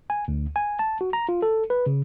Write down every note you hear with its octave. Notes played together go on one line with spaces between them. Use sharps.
G#5
D2
G#5
A5
F#4
A#5
F4
A4
B4
C#3